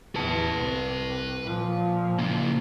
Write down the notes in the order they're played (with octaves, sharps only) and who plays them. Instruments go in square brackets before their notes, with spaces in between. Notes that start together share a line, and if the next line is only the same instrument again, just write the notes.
[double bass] E2 [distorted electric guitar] B4 A5
[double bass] C2
A#2 F3
[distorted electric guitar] C#3 A#3